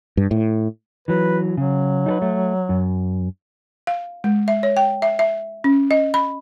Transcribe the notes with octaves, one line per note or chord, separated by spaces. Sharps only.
G2
A2
E3 F#3 B4
C#3 F#3
D#4 A4 B4
A3
F#2
F5
G#3
E5
C#5
G5
E5
E5
C#4
D#5
B5